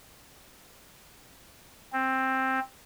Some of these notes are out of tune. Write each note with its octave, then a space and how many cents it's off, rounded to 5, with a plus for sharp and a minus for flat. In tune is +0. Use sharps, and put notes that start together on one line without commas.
C4 +10